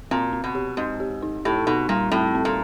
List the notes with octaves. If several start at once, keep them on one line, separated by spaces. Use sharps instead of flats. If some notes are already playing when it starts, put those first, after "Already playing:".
A#2 C4
C4
B2
G4
G#2 C4
G4
D#4
A2 G4
B2 D#4
A#2 G3
A2 C4
C4
A#2